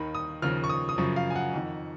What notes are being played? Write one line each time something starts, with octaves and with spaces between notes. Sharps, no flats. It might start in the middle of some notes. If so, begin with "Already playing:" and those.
Already playing: D#2 D#3 B5
D#6
D#2 C#3 F3 F6
C#6
D#6
D#6
F#2 C#3 F3 C#6
F5
G#5
F#5
F2 D#3